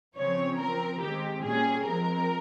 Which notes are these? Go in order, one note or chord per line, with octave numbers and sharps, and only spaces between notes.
C#3 F3 C4 C#5
F3 C4 A#4
D#3 G#3 C4 G4
A#2 G3 C#4 G#4
F3 G#3 C4 A#4